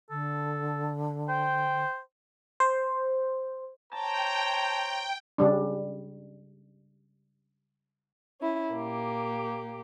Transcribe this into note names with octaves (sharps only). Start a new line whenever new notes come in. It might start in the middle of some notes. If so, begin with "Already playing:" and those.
D3 A4
C5 G5
C5
C5 C#5 G5 A5 A#5
C#3 G3 D4
C#4 E4
A#2 A#3 G4